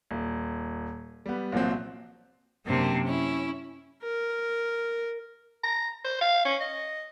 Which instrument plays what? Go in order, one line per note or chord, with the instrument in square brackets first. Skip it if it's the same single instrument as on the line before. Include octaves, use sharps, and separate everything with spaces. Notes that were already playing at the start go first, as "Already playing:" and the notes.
[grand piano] D#1
G3 B3
C2 A#2 F3 F#3 C4
[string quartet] F#2 C3 A#3 C4 D4
C#4 E4
[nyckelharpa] A#4
[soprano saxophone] A#5
C5
F5
C#4
D#5